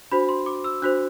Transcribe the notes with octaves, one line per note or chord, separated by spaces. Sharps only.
D4 F#4 C5 B5
C6
D6
E6
D4 F#4 C5 F#6